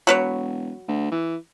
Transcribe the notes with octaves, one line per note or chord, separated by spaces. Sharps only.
E1 F#3 B4 C#5
D2
E3